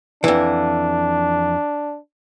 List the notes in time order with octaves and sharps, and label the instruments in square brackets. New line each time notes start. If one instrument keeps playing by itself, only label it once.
[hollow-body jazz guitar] F2 E3 [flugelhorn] D4